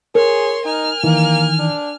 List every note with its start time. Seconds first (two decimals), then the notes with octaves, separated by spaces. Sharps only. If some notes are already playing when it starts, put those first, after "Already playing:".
0.15 G#4 A#4 C#5 C6
0.66 D#4 G#5 F6
1.04 D#3 E3 A#3
1.60 D4